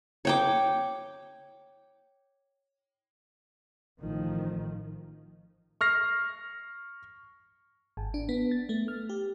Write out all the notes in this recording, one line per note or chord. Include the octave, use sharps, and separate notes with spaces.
C#5 G5 D6
A1 D#3 F3
C#6 F6 A#6 C7
G#1
D4
B3
A6
A3
F6
G4